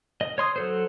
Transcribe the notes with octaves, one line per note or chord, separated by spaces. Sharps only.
D#5
C#5 C6 D#6
F#3 A4 C5